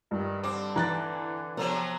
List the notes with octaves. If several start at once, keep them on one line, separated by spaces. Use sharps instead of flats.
G2 D#3
D3 C4 D6
E3 A#5 F#6 A6
C3 F3 F#3 B3